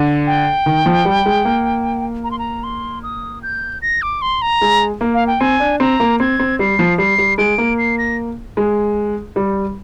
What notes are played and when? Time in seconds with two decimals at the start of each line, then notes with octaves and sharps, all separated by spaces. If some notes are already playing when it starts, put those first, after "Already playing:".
Already playing: D3
0.27 G5
0.66 D#3
0.86 F3
1.05 G3
1.26 G#3
1.45 A#3
2.24 A#5
2.31 C6
2.39 A#5
2.63 C6
3.03 D#6
3.43 G6
3.82 A#6
4.02 D6
4.22 C6
4.42 A#5
4.61 G#3
5.01 A#3
5.14 F5
5.27 G5
5.40 C4 G#5
5.60 D4
5.80 C4 A#5
6.00 A#3
6.20 C4 G#6
6.40 C4
6.59 G3 C7
6.79 F3
6.98 G3 C7
7.18 G3
7.38 G#3 D7
7.58 A#3
7.78 C7
7.98 A#6
8.57 G#3
9.36 G3